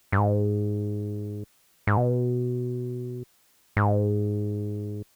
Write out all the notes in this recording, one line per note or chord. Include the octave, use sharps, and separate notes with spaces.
G2
G#2
G#2
B2
G#2